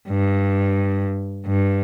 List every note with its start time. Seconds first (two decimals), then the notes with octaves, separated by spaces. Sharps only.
0.08 G2
1.47 G2